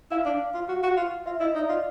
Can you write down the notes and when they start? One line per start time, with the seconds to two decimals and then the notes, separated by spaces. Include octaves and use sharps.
0.11 E4 F5
0.25 D4
0.54 F4
0.69 F#4
0.83 F#4
0.97 F4
1.26 F4 E5
1.40 E4 D#5
1.55 D#4 D5
1.69 F4